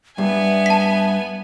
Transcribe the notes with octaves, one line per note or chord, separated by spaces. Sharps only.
G2 B3 E5 G#5
A5 B6